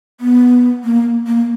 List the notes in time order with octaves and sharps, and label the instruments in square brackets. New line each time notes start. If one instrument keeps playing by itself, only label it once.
[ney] B3
A#3
A#3